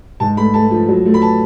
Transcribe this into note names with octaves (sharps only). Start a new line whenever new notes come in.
G#2 A5
A3 B5
A3 A5
F3
F#3
A3
B5
A5